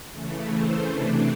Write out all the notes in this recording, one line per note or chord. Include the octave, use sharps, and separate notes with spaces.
C#3 E3 A3
C5
C3 E3 A3 D4